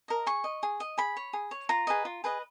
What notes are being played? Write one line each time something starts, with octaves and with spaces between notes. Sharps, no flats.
A#4 D#5
G#4 C#6
D#5
G#4
D#5
G#4 B5
C#5
G#4
C#5
F4 A#5
G#4 B4 D#5
F4
G#4 B4 D#5